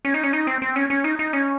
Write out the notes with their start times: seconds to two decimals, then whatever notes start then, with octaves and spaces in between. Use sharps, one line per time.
0.05 C#4
0.14 D#4
0.23 C#4
0.33 D#4
0.47 C4
0.62 C4
0.76 C#4
0.90 C#4
1.04 D#4
1.19 D#4
1.33 C#4